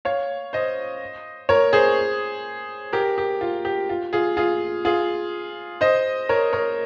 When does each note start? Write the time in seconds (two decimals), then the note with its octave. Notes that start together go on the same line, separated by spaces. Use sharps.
0.05 C#5 F5
0.53 C5 D#5
1.49 A#4 C#5
1.73 G#4 C5
2.93 G4 A#4
3.18 G4
3.41 F4
3.65 G4
3.89 F4
4.13 F4 G#4
4.37 F4 G#4
4.85 F4 G#4
5.81 C5 D#5
6.29 A#4 C#5
6.53 A#4 C#5